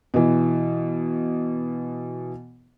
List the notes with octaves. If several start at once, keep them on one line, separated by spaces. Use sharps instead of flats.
B2 E3